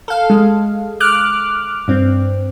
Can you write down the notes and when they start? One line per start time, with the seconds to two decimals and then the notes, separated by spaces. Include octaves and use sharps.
0.08 A4 F5
0.30 G#3
1.00 D6 F6 F#6
1.88 G2 C4